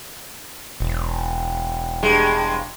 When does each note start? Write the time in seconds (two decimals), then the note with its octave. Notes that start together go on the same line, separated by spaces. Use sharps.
0.80 E1
2.03 G2 G#3